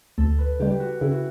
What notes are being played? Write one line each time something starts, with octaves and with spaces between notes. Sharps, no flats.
D2 A4
B4
C#3 G3 G4
G4
F#4
C#3 E4
F#4